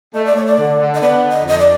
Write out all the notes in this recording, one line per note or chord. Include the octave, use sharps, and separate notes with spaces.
A3 D#5
D5
A3 C#5
D5
D3
D3
D#5
B3 D5
D3
D#5
F2 D#5
D5